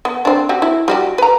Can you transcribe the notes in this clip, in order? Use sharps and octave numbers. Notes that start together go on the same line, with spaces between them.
B3
C4 D4
C4 F#4 G4
E4
G3 F#4 G4
B4 A#5